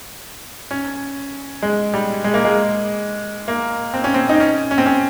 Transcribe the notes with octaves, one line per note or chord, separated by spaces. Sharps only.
C#4
G#3
G3
G#3
A#3
G#3
A#3
C4
C#4
C4
D#4
C#4
C#4
C4
C#4